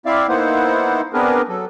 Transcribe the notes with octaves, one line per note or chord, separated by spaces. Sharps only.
C4 E4 D5 E5 F5
A#3 B3 D#4 E4 C5 F#5
B3 C4 D4 G#4 A#4 B4
F#3 A4